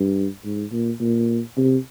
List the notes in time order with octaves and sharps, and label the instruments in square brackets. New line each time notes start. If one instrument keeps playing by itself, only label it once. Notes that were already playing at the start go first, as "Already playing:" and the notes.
Already playing: [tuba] G2
G#2
A#2
A#2
C3